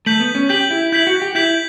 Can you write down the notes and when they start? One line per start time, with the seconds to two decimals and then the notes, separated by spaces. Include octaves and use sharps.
0.06 A3 G6 B6 F#7
0.20 B3
0.35 C#4
0.49 G4 G6 B6 F#7
0.70 E4
0.92 E4 G6 B6 F#7
1.07 F#4
1.22 G4
1.35 E4 G6 B6 F#7